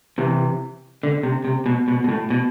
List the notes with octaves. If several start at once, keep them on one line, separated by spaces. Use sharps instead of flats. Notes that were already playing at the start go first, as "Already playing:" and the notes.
C3 E3
D3
C3
C3
B2
B2
B2
A2
B2